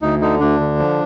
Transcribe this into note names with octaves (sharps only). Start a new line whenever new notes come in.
D2 D#4
D3 D#4
D2 D4
D3
F3